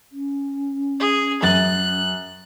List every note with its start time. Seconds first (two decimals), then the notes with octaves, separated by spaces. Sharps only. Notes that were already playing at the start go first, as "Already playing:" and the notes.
0.12 C#4
1.00 G#4
1.43 F#2 F#6 A6 F#7